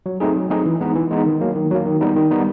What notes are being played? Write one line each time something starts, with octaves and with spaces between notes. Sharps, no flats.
F#3
A3 C4 D#4 G#4
F#3
A3 C4 D#4 G#4
E3
G#3 B3 D#4
E3
G#3 B3 D#4
D#3
F#3 A#3
D#3
F#3 A#3
D#3
G3 B3 D#4
D#3
G3 B3 D#4